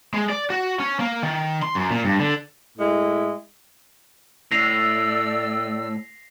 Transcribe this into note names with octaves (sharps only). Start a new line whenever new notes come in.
G#3
D5
F#4
C#4
A#3
D#3
C6
F#2
A#2
G2
D3
A2 G#3 E4
A2 D5 E6 A#6 C7 F7